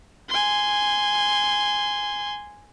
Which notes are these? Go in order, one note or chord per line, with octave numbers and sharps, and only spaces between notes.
G#5 C6